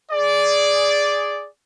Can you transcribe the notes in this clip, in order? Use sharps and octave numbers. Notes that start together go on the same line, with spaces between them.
G#4 D5